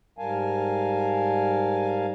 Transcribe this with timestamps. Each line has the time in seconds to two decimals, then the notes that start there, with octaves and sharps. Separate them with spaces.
0.18 G#2 G3 A#4 F5 G#5 A5